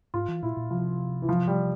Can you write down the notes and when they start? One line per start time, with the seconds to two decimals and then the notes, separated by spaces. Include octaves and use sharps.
0.14 G#2 F4
0.28 E3
0.43 A#2 E4
0.57 A#2
0.71 C3 F3
1.22 E3
1.29 F3
1.48 G3